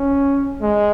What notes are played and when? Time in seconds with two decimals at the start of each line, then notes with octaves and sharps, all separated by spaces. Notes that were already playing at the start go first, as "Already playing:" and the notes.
Already playing: C#4
0.61 G#3